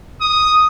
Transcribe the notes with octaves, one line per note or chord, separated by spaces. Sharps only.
D#6